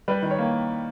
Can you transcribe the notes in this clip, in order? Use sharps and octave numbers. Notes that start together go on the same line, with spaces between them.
G3 B4
D#3
C#5
A#3